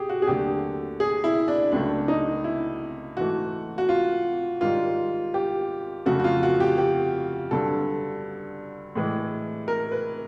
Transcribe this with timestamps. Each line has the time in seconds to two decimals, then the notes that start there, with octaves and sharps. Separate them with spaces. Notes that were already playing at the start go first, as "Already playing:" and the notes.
Already playing: G4 G#4
0.09 F#4
0.22 G#4
0.27 D#2 D3 F#3 A3 G4
1.00 G#4
1.24 E4
1.48 D4
1.72 C#2 C#3 F#3 A3 D4
2.08 D#4
2.44 E4
3.17 G#2 E3 A3 F#4
3.78 F#4
3.89 F4
4.61 G#2 D#3 G3 F4
5.34 G4
6.06 F2 C#3 F#3 A3 F#4
6.19 F#4
6.24 F4
6.43 F#4
6.60 G4
6.78 G4
7.51 G2 D3 F#3 A4
8.95 A2 E3 G#3
9.68 A#4
9.92 B4